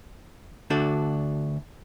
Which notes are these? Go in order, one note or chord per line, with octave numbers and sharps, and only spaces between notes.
D2 D4 F#4 A4